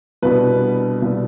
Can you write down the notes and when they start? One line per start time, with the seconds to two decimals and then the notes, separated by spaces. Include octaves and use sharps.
0.22 C2 B2 B3 D4 B4
1.02 C2 B2 B3 D4